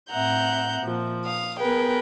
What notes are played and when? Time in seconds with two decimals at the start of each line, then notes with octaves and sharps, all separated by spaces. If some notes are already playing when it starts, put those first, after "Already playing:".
0.11 A2 C4 E5 F#5 A#5 G6
0.81 A#2 F3
1.26 F5 D#6
1.60 B3 G#4 A#4 B4 G5